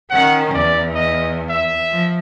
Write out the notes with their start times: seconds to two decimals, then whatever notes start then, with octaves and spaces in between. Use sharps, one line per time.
0.10 D#3 C#4 F#5
0.54 E2 D5
0.95 D#5
1.49 E5
1.91 F3